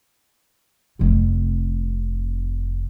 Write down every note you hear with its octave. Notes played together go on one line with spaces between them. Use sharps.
F1 C3